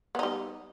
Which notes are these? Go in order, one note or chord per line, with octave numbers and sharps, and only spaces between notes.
G3 B3 D#4